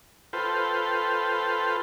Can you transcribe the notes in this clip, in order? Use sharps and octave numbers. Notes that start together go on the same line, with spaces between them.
F4 A4 B4 C5 G5